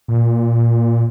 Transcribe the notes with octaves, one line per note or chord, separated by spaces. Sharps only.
A#2